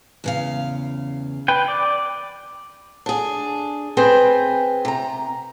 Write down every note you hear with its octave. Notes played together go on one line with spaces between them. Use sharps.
E2 C#3 F5
B4 G5
D5
D4 G#4
C4 G#4 B4 G5
C3 A#5